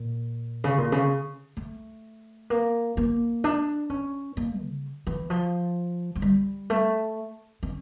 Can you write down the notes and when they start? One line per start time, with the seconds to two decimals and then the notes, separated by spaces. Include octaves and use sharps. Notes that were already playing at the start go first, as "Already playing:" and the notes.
Already playing: A#2
0.64 C#3
0.78 A#2
0.92 C#3
1.57 A3
2.50 A#3
2.97 A#3
3.44 D4
3.90 C#4
4.37 A#3
4.60 C#3
5.07 E3
5.30 F3
6.16 F3
6.22 G3
6.70 A3
7.63 C#4